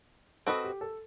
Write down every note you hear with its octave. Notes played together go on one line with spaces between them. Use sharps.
C4 F#4 A4 B4 D#5
G4
A4